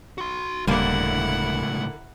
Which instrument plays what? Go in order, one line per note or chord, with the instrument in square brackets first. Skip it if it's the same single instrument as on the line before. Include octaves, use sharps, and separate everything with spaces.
[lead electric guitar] F#4 C6
[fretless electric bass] D#1 G3 [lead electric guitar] C#2 A2 [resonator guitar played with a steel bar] D3 A#3 [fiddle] E4 F#5